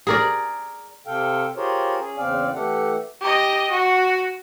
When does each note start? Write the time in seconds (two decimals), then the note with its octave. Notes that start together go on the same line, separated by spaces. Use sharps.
0.07 G#4 A#4 D5
1.07 C3 A4 F5 G5
1.56 F4 G4 G#4 A#4 C5 C#5
1.99 C#4 G#4
2.18 E2 C#3 C4 D5 F5
2.54 E3 A3 G4 A4 F#5
3.21 G4 D#5
3.70 F#4